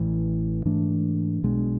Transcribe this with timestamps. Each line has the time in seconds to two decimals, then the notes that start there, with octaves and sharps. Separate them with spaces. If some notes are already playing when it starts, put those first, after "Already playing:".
Already playing: A1 A2 E3
0.65 G#2 E3 A3 D4
1.43 B1 B2 G#3 D4